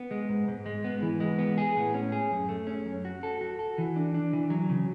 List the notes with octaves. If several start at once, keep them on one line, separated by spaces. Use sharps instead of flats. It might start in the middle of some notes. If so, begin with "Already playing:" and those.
Already playing: B3
G#3
G#2
G#2
G#3
B3
E3
G#3
B3
G#4
A2
C#4
G#4
F#2
A3
C#4
F#2
F#4
A4
F#4
A4
E3
D4
D4
E3
F#3
C#3